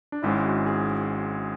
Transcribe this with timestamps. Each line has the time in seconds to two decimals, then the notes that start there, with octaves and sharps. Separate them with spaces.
0.12 D4
0.22 G#1 G#2 G#3 C#4 E4
0.44 F#4
0.66 G#4